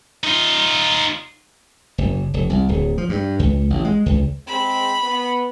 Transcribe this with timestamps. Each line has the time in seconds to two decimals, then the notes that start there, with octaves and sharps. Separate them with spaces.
0.24 D#4 F4
1.98 F#1
2.34 F1
2.50 C2
2.69 D1
2.98 F3
3.09 G2
3.39 C#2
3.70 A1
3.85 G#3
4.06 C#2
4.47 G#3 C4 B5
5.02 B3